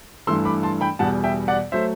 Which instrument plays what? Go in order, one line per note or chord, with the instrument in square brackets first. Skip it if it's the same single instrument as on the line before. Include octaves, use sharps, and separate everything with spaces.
[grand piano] G2 E3 A3 C6 E6
B5 D6
A5 C6
G5 B5
E2 B2 G3 F#5 A5
E5 G5
D5 F#5
F#3 A3 C5 E5